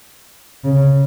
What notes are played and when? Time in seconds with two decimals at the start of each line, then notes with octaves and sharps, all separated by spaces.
0.64 C#3